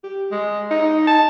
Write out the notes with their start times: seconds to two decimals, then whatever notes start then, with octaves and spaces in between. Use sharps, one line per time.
0.04 G4
0.32 G#3
0.71 D#4
1.07 A5